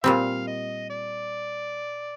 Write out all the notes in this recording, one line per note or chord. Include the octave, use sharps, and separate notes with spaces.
A#2 G3 C4 F5
D#5
D5